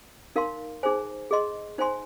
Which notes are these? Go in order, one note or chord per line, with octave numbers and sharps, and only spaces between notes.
D#4 A#4 F5 C6
D#4 G#4 C5 G#5
G#4 D#5 C6
D#4 C5 G#5 C6